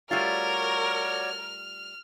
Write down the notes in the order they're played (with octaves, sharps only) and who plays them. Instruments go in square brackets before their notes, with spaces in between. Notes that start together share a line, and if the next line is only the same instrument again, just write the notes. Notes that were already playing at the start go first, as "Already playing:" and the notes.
[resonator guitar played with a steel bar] G3 A3 F4 [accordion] F#4 C#5 D5 [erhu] A#4 [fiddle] F6